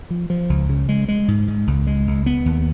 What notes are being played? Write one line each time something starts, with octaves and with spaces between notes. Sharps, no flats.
F3
F3
C#2
C#3
G#3
G#3
G#2
G#2
C#2
G#3
C#2
B3
D#2